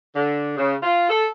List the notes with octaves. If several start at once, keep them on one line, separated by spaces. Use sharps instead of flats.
D3
C#3
F4
A4